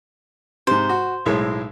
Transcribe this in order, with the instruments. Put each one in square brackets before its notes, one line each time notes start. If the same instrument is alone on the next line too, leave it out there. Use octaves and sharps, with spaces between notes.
[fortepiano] G#2 C3 [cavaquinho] C5
[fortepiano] F#4
B1 A2 G#3